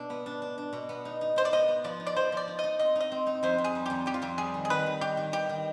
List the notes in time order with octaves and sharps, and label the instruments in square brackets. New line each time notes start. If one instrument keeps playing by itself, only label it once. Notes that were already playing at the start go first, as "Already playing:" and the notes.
Already playing: [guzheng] B2 D4
B3
D4
D4
D4
B2
B3
D#4
D#4
[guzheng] D#4 [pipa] C5
[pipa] D5
[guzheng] B3 [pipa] D#5
[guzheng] B3
[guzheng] F3 [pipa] D5
[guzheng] D#4
[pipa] D5
[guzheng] F3 [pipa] C5
[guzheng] F3 [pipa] D5
[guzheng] D#4
[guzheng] D#4 [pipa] D#5
[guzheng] C4 [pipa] D#5
[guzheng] D#4
[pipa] D#5
[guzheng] C4
D#4
[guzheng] F2 [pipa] C5
[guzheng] F2
[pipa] G#4
[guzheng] G3
[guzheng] F2 [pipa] G4
[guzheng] F2 [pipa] G4
[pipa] F4
[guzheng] F2 [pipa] G4
[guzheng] G3 [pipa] G#4
[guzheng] D#3
[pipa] G#4
[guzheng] D#3 [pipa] B4
[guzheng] D#4
[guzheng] D#3 [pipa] G4
[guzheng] D#3
[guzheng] B3 [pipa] G4
[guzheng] D#3